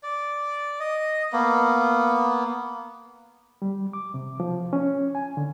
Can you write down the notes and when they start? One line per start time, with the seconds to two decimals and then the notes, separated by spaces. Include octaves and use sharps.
0.03 D5
0.80 D#5
1.32 A#3 B3
3.62 G3
3.93 D6
4.14 C3
4.40 F3
4.73 C#4
5.15 G#5
5.37 D3